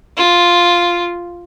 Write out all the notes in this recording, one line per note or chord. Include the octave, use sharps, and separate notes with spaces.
F4